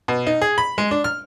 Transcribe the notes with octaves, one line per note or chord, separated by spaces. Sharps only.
B2
D#4
G#4
B5
G#3
D4
F6